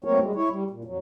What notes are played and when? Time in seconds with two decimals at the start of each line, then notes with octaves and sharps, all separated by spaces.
0.04 F#3 A3 A#3 C4 A#4 C#5
0.19 G3 G#3
0.36 E4 C#5
0.49 G3
0.70 A#2
0.85 F2 F#3